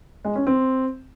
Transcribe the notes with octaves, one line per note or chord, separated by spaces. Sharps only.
G#3
C#4
C4